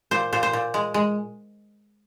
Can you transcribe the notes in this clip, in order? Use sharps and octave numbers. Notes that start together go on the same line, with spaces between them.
A#2 C5
A#2 C5
C5
A#2
G#3
G#3